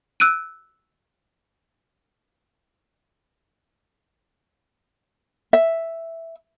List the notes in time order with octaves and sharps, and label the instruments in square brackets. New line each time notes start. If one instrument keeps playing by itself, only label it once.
[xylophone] E6 F#6 D7 D#7
[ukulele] E5